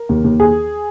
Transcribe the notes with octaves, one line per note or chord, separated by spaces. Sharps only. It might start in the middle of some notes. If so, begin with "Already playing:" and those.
Already playing: A#4
D#2
D#2
G#4